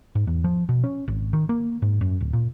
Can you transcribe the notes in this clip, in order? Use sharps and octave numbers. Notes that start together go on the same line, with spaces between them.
G#2
E2
F3
B2
C#4
G#1
D#3
A#3
G#2
F#2
D1
A#2